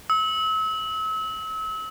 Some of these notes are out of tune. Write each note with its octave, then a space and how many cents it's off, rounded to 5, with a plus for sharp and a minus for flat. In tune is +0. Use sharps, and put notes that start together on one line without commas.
E6 -35